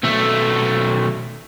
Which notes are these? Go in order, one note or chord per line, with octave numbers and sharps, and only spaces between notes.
B1 A3